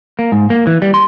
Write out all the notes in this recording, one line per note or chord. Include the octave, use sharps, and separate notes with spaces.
A#3
G#2
A#3
E3
G3
C6